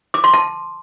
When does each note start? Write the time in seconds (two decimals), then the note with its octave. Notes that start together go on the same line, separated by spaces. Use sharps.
0.14 D6
0.24 C6
0.34 A5